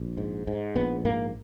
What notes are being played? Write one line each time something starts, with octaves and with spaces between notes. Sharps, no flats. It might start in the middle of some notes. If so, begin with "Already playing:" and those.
Already playing: A#1
G#2
G#2
A#1 B3
G#2 A#3